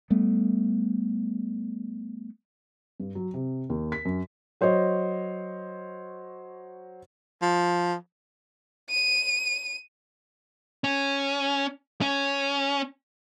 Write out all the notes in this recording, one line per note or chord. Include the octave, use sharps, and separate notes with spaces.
G3 A3 B3
G2
F#3
C3
D#2
B6
F#2
F#3 C5 C#5 D#5
F3
D#7
C#4
C#4